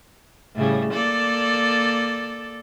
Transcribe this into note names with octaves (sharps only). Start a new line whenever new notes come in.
A2 C#3 G3
A#3 A4 D5